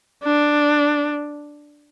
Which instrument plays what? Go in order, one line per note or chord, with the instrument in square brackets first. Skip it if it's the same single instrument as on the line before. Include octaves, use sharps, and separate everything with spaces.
[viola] D4